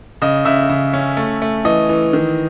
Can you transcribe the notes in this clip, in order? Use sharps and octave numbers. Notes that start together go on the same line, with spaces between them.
C#3 D#5
C#3 E5
C#3
C#4
A3
A3
E3 D#5
E3
D#3